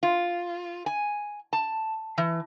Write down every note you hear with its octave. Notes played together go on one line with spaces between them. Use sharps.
F4
G#5
A5
E3